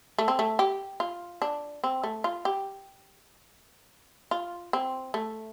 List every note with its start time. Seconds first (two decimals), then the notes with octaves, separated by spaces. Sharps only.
0.18 A3
0.28 C4
0.39 A3
0.59 G4
1.00 F4
1.42 D4
1.84 C4
2.04 A3
2.24 F4
2.45 G4
4.31 F4
4.73 C4
5.14 A3